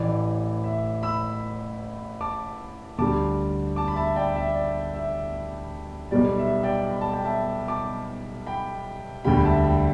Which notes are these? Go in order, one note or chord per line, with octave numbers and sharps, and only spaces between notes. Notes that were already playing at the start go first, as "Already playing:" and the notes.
Already playing: A1 A2 E3 D5
E5
B5 E6
A5 D6
D2 D3 G3 A5 D6
A5 D6
B5
E5 A5
D5 G5
E5
D5
E5
B1 B2 G3 D5
E5
D5 G5
B5
A5
G5
E5 A5
A5 D6
G5 B5
E1 D2 D3 G3 G5 B5
E5 A5
G5 B5